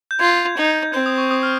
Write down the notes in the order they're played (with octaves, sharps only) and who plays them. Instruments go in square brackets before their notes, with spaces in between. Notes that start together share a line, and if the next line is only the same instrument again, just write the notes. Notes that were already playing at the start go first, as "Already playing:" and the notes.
[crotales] G6
[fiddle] F4 [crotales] G#6
[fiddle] D#4
[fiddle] C4 [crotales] G6
[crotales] D#6
C#6
D#6
F6